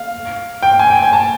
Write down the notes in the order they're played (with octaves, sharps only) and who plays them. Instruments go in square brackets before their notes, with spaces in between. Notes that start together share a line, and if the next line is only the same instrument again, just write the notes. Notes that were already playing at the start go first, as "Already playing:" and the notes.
Already playing: [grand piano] F5
G5
G#5
G5
G#5
A5